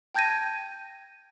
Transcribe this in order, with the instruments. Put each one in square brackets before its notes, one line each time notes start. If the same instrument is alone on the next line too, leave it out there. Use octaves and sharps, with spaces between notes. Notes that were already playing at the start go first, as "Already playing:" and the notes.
[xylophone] G5 A5 G6 G#6 A#6 D#7